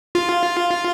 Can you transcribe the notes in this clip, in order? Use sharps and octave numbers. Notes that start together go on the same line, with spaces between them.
F4